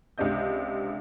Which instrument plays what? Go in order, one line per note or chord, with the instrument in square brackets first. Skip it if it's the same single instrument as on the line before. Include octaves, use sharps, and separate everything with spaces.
[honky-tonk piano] C#2 C3 D4 D#5 G6